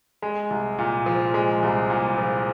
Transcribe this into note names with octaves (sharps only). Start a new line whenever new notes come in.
G#3
C2
A#2
F3
G#3
C2
A#2
F3